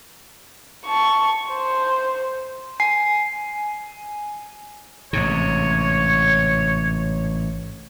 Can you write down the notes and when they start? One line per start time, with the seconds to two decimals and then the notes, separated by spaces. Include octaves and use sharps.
0.86 A5 C#6
1.50 C5
2.80 G#5 C7
5.13 A1 G#2 C3 C#5